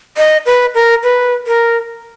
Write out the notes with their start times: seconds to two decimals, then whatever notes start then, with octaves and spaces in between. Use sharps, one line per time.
0.17 D#5
0.46 B4
0.75 A#4
1.03 B4
1.47 A#4